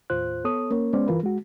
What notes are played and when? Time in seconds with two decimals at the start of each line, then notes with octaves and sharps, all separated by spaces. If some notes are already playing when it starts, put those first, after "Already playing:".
0.10 D#2 A2 F4 C5 F#6
0.44 B3 A4 C#5 D#6
0.71 A#3 C#4 A#4 C#5
0.93 G#3 B3 C#4 C5 D5
1.08 G2 E3 F4 A#4 B4
1.23 G#3 F#4